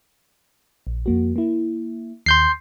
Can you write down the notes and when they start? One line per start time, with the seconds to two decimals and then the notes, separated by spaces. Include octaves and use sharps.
0.87 A#1
1.06 F2 A#3 F#4
1.36 A#3 E4
2.26 D#2 C6 G6 C7